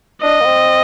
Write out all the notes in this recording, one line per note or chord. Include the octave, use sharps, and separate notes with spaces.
D4 D#5
A#3
C4